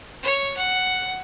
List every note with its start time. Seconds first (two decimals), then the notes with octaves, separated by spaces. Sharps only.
0.23 C#5
0.57 F#5